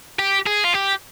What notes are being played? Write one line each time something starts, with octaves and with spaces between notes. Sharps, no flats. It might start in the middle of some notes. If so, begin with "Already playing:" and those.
G4
G#4
F4
G4